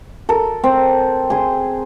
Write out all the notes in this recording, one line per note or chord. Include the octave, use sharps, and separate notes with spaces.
A4 A#4
C4
G#4 C6